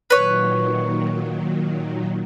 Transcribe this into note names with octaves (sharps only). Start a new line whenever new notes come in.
A#2 D#3 F#3 B4 C#5